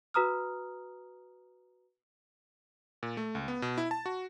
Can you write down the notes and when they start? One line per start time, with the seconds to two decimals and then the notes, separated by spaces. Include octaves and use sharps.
0.14 F#4 B4 A#5 D#6 F6
3.03 A#2
3.17 A3
3.35 C#2
3.48 B3
3.62 B2
3.78 E4
3.91 A5
4.06 F#4